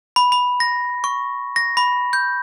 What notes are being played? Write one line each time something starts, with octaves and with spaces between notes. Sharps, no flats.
B5
B5
A#6
C#6
A#6
B5
G6